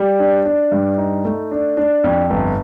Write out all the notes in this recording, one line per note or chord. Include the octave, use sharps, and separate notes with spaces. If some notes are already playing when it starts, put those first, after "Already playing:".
Already playing: G3
D4
D4
G2
D#4
A3
D4
D4
F2
G1